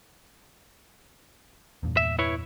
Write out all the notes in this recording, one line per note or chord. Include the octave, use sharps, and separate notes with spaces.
E2 G2 A#2
E5
E4 B4 C#5